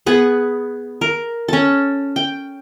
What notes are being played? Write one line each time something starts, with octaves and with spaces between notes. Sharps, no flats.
B3 G#4 F#5
A#4
C#4 A4
G5